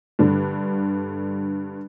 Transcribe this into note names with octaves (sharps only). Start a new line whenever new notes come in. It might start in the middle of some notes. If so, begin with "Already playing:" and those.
G2 D3 D4